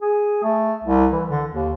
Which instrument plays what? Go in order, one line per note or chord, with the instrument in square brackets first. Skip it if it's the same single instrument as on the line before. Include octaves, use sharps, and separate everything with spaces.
[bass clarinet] G#4
A3
C2
E3
D3
D#2